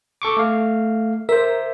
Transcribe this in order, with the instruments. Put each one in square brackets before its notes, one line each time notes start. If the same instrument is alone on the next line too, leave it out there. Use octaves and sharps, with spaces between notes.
[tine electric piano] A4 C#6 D6
A3 F5
[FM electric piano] A#4 [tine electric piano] C5 E5